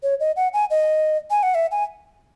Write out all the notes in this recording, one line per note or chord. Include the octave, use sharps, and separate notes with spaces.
C#5
D#5
F#5
G#5
D#5
G#5
F#5
E5
G#5